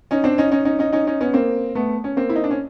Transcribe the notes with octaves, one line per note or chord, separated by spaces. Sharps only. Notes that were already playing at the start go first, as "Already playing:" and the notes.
C#4 D#4
C4 D4
C#4 D#4
C#4 D#4
C#4 D#4
C#4 D#4
C#4 D#4
C#4 D#4
B3 C#4
A#3 C4
A3 B3
C#4
A#3 C4
E4
D#4
D4
C#4